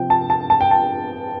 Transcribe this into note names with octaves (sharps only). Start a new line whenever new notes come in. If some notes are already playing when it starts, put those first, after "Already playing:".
Already playing: C3 F3 C4 G5
A5
A5
A5
G5
A5